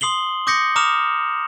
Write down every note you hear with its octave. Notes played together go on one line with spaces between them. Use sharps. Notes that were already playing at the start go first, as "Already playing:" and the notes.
C6 D#6 C7 F#7 G7
D6 D#6 G6 A#6 C7 C#7
A#5 D6 D#6 F6 E7 F7